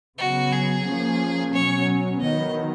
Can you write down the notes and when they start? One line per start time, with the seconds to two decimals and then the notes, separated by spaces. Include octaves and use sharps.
0.18 C#3 F#3 B3 F#4
0.52 G#4
0.86 F3 A#3 C#4
1.53 B2 F#3 C#4 C#5
2.20 D#3 F#3 B3 D#5